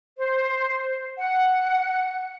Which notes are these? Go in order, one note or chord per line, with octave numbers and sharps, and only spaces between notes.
C5
F#5